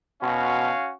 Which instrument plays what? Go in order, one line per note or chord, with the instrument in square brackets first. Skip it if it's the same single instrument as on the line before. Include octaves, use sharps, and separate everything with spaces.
[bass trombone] B2 [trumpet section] C#4 F#4 F5